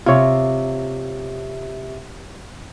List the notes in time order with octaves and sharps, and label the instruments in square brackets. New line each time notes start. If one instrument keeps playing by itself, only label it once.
[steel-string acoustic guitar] C3 [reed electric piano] F4 C#5